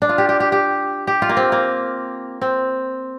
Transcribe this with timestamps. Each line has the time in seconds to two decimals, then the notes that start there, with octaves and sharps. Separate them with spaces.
0.02 D4
0.09 F4
0.18 G4
0.29 G4
0.40 G4
0.52 G4
1.07 G4
1.22 F4
1.29 A#3
1.37 C4
1.52 A#3
2.41 C4